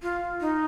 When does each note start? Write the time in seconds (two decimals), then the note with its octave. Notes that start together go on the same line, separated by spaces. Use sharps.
0.03 F4
0.41 D#4